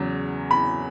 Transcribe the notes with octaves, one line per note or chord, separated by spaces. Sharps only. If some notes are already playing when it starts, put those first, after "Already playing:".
Already playing: E2 C#3 F#3
B5